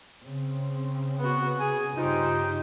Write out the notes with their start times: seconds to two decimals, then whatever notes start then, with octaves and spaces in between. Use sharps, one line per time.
0.23 C#3 C4
1.19 B3 F#4
1.59 G#4 G#5
1.96 G2 C#3 D#4 F4 G4 C5